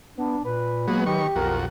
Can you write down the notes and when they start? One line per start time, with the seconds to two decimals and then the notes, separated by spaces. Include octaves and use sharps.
0.17 B3 D4
0.44 A#2 B4
0.88 F#3 G#3 A#3 B3 F#4
1.06 D#3 G4 C#6
1.36 B1 F2 F#4 A#4